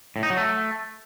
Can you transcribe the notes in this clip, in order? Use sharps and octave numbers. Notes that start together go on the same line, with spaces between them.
A2
D#4
F#3
A3